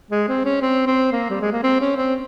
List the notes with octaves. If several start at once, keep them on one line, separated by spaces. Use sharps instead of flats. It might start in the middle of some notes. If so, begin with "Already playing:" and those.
G#3
C4
C#4
C4
C4
A#3
G3
G#3
A#3
C4
C#4
C4